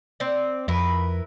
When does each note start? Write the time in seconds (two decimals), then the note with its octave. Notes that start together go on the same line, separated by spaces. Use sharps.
0.20 C4 D5
0.68 F2 E4 A#4 B4